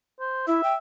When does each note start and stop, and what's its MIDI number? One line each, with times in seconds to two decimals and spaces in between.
0.20 0.43 72
0.47 0.61 64
0.47 0.78 76
0.64 0.74 79